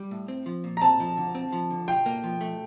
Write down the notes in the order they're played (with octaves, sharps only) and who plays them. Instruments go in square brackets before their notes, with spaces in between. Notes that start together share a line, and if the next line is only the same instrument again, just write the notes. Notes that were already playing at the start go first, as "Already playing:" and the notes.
Already playing: [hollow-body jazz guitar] G3
A2
C4
F3
A#2
[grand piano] A#5
[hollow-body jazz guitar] C4 [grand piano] A5
[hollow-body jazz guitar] F3
D3
C4
F3
D3
[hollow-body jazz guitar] F4 [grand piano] G5
[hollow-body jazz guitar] A#3
F3
A3